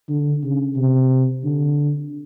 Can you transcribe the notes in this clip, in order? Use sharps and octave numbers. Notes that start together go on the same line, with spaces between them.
D3
C#3
C3
D3